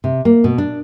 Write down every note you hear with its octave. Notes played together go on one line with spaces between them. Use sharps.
C3
A#3
B2
D4